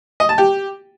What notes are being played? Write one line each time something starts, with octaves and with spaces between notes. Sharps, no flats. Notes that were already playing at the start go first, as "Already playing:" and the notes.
D#5
A5
G4